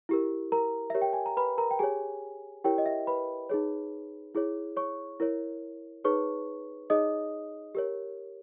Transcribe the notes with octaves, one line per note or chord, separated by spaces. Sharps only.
E4 G4 A#4
A#4 A#5
G4 A#4 C#5 E5
G5
G#5
A#5
B4 B5
A#4 A#5
G5
G4 G#4 C#5 G#5
E4 G4 A#4 C#5 G5
D#5
E5
B4 B5
D#4 G#4 C#5
E4 G#4 C#5
C#5 C#6
E4 A#4 C#5
D#4 G#4 B4 C#5 C#6
D#4 G#4 C#5 D#5 D#6
G4 A#4 C#5